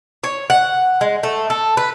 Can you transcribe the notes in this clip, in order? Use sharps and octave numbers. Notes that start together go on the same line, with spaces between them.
C#5
F#5
G#3
A3
A4
B4